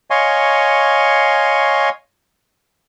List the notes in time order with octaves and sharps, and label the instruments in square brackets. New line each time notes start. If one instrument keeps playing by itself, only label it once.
[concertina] C#5 D#5 F5 G#5 C6 C#6